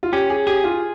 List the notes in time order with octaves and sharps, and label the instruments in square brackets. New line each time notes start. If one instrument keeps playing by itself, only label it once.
[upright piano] F4
[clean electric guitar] C#4 [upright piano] G4
[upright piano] G#4
[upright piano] G4 [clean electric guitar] G#4
[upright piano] F4